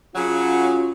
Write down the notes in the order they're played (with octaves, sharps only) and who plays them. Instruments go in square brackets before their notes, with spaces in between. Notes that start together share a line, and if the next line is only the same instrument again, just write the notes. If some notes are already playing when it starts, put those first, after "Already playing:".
[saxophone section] C#3 F#3 [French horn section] C#4 F4